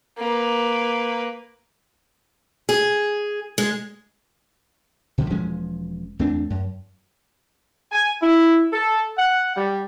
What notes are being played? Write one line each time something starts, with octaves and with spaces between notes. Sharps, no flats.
A#3 B4
G#4
G#3
B2 D3 F3
E1 F3 G#3 C#4
E2 A3 C4 D4
F#2
G#5
E4
A4
F#5
G3